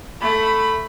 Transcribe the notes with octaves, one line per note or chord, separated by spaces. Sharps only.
A3 B5